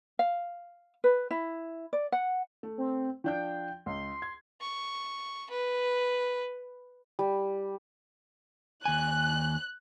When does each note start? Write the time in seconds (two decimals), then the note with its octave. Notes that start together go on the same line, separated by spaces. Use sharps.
0.19 F5
1.04 B4
1.31 E4
1.93 D5
2.12 F#5
2.63 A3
2.78 C4
3.24 F3 D4 G5 G6
3.86 C#2 C6
4.22 G#6
4.61 C#6
5.50 B4
7.19 G3
8.85 D#2 G#5 F#6